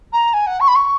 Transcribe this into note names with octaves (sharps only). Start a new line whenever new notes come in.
A#5
G#5
F#5
C#6
B5
C#6